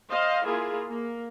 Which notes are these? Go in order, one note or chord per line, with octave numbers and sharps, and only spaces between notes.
C5 D#5 F5
A#3 E4 F4 G#4
A#3